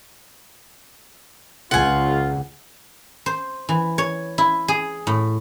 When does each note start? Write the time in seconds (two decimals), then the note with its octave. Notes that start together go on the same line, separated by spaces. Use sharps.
1.71 C#2 F4 F#5 G#5
3.26 C5
3.69 E3
3.98 C#5
4.38 E4
4.68 G#4
5.07 A2